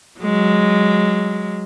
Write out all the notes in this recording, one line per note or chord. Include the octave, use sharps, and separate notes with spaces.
F#3 G#3